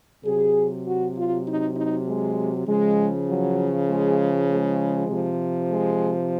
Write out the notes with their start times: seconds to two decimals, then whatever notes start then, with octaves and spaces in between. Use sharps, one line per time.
0.24 C3 F#3 G#4
0.85 F#4
1.15 F4
1.45 D#4
1.76 D#4
2.06 G#3
2.66 C#3 F3 G#3
3.28 F#3
3.88 G#3
4.49 G#3
5.09 C3 F3
5.69 G#3